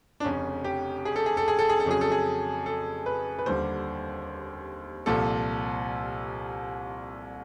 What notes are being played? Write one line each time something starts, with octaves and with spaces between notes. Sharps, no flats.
D4
F1 F2 C#3 C#4
G4
G#4
A4
G#4
A4
G#4
A4
G#4
A4
F2 C#3 F#3 G#4
A4
G#4
A4
B4
B4
D#2 D3 G3 C5
C2 A#2 F3 A4